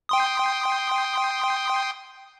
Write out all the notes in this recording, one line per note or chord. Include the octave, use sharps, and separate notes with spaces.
G5 C6 D#6